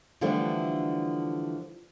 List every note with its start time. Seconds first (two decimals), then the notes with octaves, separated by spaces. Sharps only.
0.21 D3 E3 F3 G3 A3 D4